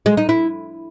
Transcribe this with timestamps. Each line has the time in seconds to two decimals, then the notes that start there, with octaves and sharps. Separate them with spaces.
0.06 G#3
0.17 D#4
0.29 E4